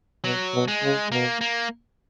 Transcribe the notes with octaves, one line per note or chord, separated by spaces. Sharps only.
B2 F#3
B2
G#3
C#3
B2 A#3
A#3